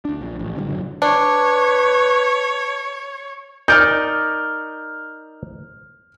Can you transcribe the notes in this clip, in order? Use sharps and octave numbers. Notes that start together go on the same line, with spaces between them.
D2 D4
A#1
A1
D3 E3 G3
F#1 D3 F#3
D4 B4 C#5
D#4 A#4 D5 F6 G6